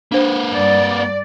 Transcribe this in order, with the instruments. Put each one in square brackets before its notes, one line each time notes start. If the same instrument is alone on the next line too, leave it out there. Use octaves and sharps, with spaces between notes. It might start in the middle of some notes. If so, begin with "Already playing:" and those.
[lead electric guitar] A#3 B4 [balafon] D4 C5
[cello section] G2 D5